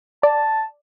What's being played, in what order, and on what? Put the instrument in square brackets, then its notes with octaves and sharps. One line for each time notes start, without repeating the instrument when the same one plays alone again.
[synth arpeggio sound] D5 [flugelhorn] A5